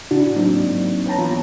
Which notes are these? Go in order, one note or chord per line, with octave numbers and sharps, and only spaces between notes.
A2 C#3 E3 D4 F#4
F#3 A#3 C4 D4 D#4
G#2
B4 C#5 G5 A5 A#5
E3 B3 F4